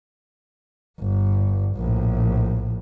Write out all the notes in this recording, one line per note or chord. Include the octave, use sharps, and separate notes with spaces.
G1 G2
A#1 A2